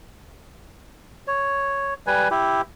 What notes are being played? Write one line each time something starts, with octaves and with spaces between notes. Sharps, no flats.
C#5
G3 B4 G#5
E4 G4